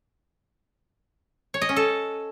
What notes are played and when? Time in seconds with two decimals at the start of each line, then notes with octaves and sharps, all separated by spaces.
1.54 C#5
1.62 D#5
1.69 C#4
1.76 A4